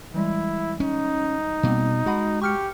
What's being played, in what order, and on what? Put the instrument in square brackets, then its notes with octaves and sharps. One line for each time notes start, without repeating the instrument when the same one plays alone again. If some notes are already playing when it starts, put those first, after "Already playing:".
[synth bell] E3 G3 G#3 [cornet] E4
[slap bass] C#4 [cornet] D#4
[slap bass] B2 [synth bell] G3 A#3 C4
[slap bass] G#3 [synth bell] F#4 F#5 B5
[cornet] G4 [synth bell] C#6 F6 C#7